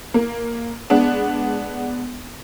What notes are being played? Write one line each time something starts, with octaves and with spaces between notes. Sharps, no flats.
A#3
G#3 B3 D4